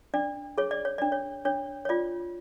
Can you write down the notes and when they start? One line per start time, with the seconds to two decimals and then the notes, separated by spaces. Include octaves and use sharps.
0.14 D4 D5
0.58 G#4 C#5
0.71 D5
0.85 C#5
0.98 D4 D5
1.12 C#5
1.45 D4 C#5
1.85 C#5
1.89 F4 D5